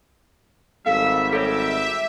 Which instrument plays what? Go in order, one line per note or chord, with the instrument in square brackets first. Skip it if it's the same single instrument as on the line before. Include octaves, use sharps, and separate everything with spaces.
[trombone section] G#1 G3 [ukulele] A4 F5 [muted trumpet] E5
[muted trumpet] G4 [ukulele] A4 C#5 D#5 [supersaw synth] E5